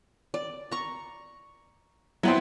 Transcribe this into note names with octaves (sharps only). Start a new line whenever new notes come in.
D5
A#5 C#6
F#3 B3 C4 E4 F#5